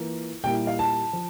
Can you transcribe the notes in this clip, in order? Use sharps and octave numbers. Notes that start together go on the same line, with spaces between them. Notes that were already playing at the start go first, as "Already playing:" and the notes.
Already playing: E3 A#3 F4
A#2 G3 A#3 E4 G5
F5
A5
F3